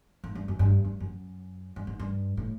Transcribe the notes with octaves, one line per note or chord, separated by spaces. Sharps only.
G#2
G2
F#2
G2
G2
F#2
G2
G#2
G2
A2